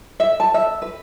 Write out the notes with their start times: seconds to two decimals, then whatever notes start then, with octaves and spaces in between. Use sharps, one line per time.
0.20 E5
0.40 A5
0.54 E5
0.82 B4